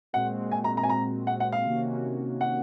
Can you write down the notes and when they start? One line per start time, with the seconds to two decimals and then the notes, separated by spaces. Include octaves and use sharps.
0.13 A#2 G#3 C4 F#4 F#5
0.52 G#5
0.64 A#5
0.77 A#5
0.83 G#5
0.89 A#5
1.27 F#5
1.40 F#5
1.52 F5
1.66 C3 D#3 A#3 C#4 F#4
2.41 F#5